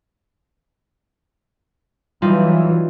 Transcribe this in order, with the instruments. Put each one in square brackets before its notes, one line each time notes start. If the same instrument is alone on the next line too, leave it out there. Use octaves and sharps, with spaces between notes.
[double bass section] E3 F#3 [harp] G3 D#4 F4